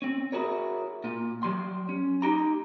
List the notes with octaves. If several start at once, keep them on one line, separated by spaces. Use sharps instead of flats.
C4 C#4
E4 F#4 G#4 A#4 C#5
A#2 F4
F#3 G3 C6
C#4
D#4 G4 A#5